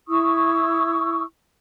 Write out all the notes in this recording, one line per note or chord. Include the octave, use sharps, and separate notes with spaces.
E4 C#6 D#6 E6